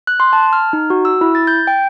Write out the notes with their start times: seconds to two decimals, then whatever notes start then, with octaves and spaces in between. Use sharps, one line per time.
0.07 F#6
0.20 C6
0.33 A5
0.53 F6
0.73 D#4
0.90 F#4
1.05 E6
1.21 E4
1.35 A6
1.47 G6
1.67 G5